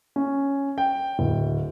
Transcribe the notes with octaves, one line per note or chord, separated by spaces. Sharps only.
C#4
G5
D1